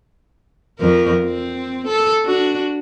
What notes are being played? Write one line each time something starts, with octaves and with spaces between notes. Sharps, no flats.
F2 A#4
C4
A4
D4 F#4